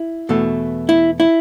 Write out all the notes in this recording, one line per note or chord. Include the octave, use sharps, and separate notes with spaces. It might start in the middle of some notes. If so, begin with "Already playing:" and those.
Already playing: E4
E2 B2 A3
E4
E4